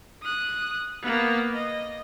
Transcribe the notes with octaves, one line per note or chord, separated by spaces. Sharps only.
D#6 F#6
A#3 B3
D#5